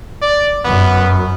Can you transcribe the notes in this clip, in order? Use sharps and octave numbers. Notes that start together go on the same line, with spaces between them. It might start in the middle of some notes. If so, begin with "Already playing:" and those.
D5
F#2 B3